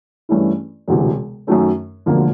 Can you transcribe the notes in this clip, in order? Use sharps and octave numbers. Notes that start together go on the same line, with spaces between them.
G2 E3 A3 C#4 E4
E1 D2 C3 E3
F#2 D#3 F#3 A3 C#4
E1 D2 D3 F3 A#3